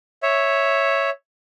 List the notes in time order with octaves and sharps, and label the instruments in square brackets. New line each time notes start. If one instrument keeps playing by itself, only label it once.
[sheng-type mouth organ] C#5 E5